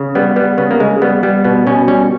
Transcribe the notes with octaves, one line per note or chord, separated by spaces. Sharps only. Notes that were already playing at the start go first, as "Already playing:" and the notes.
Already playing: C#3
G3 B3
G3 B3
C#3 B3
A#3
C#3 G#3
G3 B3
G3 B3
B2 B3
B2 C#4
G3 C#4